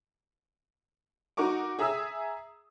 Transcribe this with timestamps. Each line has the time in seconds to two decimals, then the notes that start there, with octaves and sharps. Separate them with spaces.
1.37 D#4 F#4 A#4 C#6 D6
1.79 G#4 E5 A#5 D#6 E6